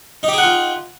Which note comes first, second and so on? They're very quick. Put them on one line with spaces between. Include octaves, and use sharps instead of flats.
D#4 G4 G#4 F#5 F4